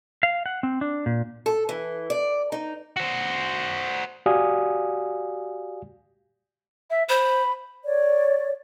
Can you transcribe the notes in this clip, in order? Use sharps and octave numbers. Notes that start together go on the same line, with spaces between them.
F5
F#5
C4
D4
A#2
A4
E3
D5
D#4
F#4 C5
F#4 G4 D5 F5 G#5 D#6
E5
C5 B5
C#5 D5